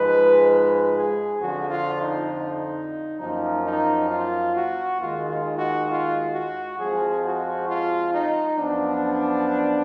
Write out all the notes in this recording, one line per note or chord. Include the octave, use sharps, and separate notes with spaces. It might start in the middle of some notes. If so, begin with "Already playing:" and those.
Already playing: G#2 F3 G#3 B4
B4
G#4
F2 D3 F3 F#4
F4
D#4
D#4
F#2 F3 A#3 D#4
D#4
F4
F#4
D#2 D#3 G#3 F4
F4
F#4
F4
F#4
F2 F3 G#3 G#4
F#4
F4
D#4
F#2 F3 B3 D4